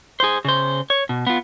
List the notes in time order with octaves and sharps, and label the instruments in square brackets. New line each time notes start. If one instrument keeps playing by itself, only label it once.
[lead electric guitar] G#4 C5
C#3 C5
C#5
B2
B3 F4